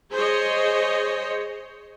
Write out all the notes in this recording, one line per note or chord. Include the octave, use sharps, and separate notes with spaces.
G#4 C5 C#5 D#5